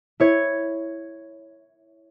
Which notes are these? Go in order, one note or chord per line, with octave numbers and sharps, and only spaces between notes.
E4 C#5 G#6